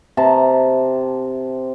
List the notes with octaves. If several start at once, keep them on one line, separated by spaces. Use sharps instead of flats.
C3 A5 A#5